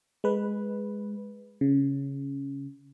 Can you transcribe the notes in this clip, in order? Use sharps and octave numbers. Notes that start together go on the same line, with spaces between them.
G#3 B4
C#3